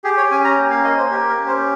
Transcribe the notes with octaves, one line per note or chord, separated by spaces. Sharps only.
G4 G#4
C#5
C#4 G#5
A#5
A#3
F5
A#3 D#5
C5
G4 A#4
A#4
C#4
C5